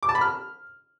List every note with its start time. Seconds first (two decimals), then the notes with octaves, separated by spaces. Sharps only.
0.03 D6
0.09 A5
0.15 B5
0.21 F6